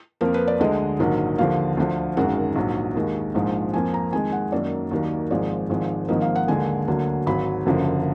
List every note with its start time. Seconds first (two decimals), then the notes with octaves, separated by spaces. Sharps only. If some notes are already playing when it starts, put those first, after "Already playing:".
0.21 F2 F3 A#3 A#4
0.34 B4
0.48 D5
0.60 D2 D3 G#3 D#5
0.99 A#1 G#2 D#3 F#3
1.38 D#2 D3 F3 F5
1.77 D2 D3 F3
2.17 G#1 F#2 D#3 G#3 F#5
2.55 A#1 G#2 F#3
2.96 D#2 D#3 G#3
3.34 A#1 G#2 F3 G#3
3.74 F2 F3 A#3 G#5
3.94 A#5
4.12 F2 D#3 G#3 G#5
4.32 F#5
4.52 F#2 D#3 F#3 A#3 D5
4.91 D#2 D#3 F#3 A#3
5.30 G#1 G#2 F3 G#3 D5
5.69 G#1 G#2 F3 G#3
6.08 G#1 G#2 F3 A#3 D#5
6.21 F5
6.35 F#5
6.48 D#2 D3 G#3 G#5
6.88 D2 D3 F#3 A#3
7.26 G#1 G#2 F#3 B5
7.66 F#1 F#2 D3 F3